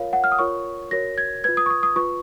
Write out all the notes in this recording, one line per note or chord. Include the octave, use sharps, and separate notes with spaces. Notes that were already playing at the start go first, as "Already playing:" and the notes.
Already playing: F4 A#4 C#5 F5
F#5
F6
D#6
F4 A#4 C#5 C#6
F#4 A#4 C#5 A#6
G#6
F4 B4 G#6
D#6
C#6
D#6
D#6
F4 B4 C#6